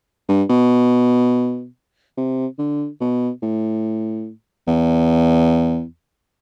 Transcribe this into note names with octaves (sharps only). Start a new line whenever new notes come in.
G2
B2
C3
D3
B2
A2
E2